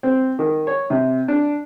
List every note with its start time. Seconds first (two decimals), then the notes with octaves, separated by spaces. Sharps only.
0.03 C4
0.39 D#3
0.67 C#5
0.90 C3
1.28 D4